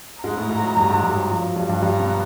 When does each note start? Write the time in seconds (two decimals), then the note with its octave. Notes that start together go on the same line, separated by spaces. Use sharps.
0.24 G#2 G#3 A#5
0.37 A2 A3
0.50 G#2 G#3
0.64 F#3
0.76 G2 G3
0.89 G#2 G#3
1.03 G2 G3
1.16 F#3
1.30 F3
1.42 F#3
1.56 G2 G3
1.69 G2 G3
1.82 G2 G3 A#5
2.00 B2 B3